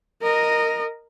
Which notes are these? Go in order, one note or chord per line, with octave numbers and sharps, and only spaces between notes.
A#4 D#5